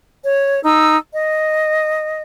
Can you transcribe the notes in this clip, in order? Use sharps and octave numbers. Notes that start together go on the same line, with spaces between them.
C#5
D#4 E6
D#5